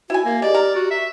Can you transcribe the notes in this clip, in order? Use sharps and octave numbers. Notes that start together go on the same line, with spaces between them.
E4 F#4 G#5
A#3 A#4
G#3 G4 D5
A#4
F#4
E5